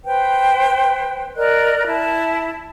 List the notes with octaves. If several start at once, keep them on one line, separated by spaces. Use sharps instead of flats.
B4 C5 G5
A#4 D5 D#5 F#6
E4 A5